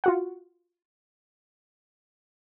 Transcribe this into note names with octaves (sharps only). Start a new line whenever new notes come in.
F4 F#4 F#5